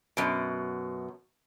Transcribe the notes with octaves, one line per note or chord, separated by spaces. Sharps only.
F#2 B2